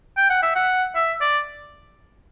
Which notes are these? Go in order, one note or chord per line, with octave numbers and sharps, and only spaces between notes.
G5
F#5
E5
F#5
E5
D5